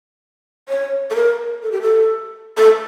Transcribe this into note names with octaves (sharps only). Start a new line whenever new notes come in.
C#5
A4
A#4
A4
G4
A4
A4